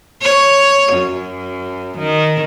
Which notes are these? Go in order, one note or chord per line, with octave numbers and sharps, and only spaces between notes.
C#5
F#2
D#3